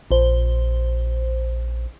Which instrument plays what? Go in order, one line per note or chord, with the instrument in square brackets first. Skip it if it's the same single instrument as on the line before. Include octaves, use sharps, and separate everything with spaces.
[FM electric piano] A#1 C5